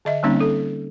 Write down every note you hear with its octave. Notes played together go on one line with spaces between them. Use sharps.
D3 D#5 E5
D3 G3 A#3 C4 C#4 D#4
A4